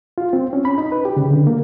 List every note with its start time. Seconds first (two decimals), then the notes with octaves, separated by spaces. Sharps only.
0.18 F4
0.33 C4
0.53 C#4
0.65 B5
0.78 D#4
0.92 B4
1.05 G4
1.17 C#3
1.31 D3
1.47 A#3